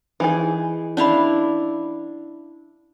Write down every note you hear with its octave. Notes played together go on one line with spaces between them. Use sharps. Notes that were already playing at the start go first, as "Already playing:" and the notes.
E3 D#4 G#4
C#4 D4 E4 F5 B5